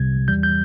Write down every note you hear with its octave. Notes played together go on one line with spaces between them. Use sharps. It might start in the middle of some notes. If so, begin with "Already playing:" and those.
Already playing: C2 C3 G3 G#6
E2 E3 G3 G6
G6